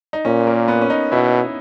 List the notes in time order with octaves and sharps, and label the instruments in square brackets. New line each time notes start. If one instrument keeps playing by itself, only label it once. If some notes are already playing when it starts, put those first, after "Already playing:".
[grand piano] D#4
[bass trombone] A#2 [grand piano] C#4
[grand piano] A#3
B3
C#4
D#4
[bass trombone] B2 [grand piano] E4